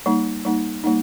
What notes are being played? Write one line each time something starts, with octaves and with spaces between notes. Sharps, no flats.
G3 A#3 D#4
G3 A#3 D#4
G3 A#3 D#4